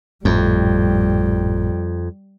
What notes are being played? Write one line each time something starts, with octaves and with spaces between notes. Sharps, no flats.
G#1 F2 A2 G3